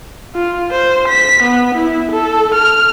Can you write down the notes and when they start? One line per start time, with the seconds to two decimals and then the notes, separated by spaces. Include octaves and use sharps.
0.35 F4
0.71 C5
1.08 B6
1.43 B3
1.75 E4
2.12 A4
2.54 F6